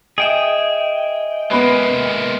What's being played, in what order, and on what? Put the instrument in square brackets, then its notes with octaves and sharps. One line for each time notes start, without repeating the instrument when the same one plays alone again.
[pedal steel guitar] G#4 G5 [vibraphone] D#5 E5
[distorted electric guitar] G#3 A#3 [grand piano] B3 B4